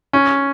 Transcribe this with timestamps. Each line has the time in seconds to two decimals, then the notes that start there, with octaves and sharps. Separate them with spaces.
0.13 C#4